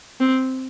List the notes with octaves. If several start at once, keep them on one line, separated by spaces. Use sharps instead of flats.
C4